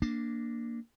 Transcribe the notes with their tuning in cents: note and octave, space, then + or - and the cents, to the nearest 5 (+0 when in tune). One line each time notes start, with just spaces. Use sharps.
A#3 +0 D4 +0